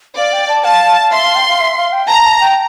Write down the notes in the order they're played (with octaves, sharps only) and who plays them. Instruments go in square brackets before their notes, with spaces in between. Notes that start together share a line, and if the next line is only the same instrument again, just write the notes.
[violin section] D5 [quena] F5
[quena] G5
A5
[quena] F5 [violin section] A5
[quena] F5
[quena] E5 [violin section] C6
[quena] F5
G5
F5
E5
F5
G5
[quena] A5 [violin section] A#5
[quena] A5
G5